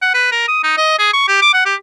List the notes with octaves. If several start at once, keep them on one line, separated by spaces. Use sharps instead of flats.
F#5
B4
A#4
D#6
D#4
D#5
G#4
C#6
G4
D6
F#5
G4